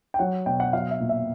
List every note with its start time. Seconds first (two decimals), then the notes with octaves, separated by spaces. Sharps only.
0.14 G5
0.19 F#3 F#5
0.46 B2 G5
0.60 F#5
0.73 F#3 F5
0.91 E5
1.00 A#2
1.09 E5